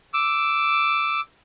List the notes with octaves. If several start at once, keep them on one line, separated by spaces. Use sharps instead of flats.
D6 E6